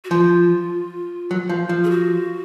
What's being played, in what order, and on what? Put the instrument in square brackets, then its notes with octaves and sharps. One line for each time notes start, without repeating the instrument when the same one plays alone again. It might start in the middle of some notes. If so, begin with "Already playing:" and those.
[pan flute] F#4
[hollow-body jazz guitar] F3 [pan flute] F4
[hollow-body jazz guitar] F#3
F3
F3
[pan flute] G#4
F#4